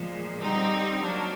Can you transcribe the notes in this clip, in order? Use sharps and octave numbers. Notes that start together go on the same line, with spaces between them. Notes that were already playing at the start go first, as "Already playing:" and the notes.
Already playing: A#2 F3 G#3
D3 G3 C4 D#4
F#3 A#3 D4